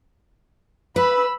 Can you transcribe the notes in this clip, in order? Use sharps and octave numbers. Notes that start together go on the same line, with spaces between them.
B4 B5 E6